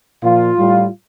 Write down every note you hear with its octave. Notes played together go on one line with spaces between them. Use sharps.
A#2 F3 F4
A2 G3